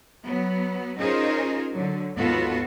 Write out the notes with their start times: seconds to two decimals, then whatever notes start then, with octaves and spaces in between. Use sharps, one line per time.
0.24 F#3 B3
0.97 C#4 D#4 F4 G#4 A#4 C5
1.73 D3 F#3
2.16 D#2 G#2 B3 F4 F#4 A4